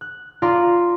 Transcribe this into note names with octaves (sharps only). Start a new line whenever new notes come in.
F#6
F4 D5 A#5 C6 D6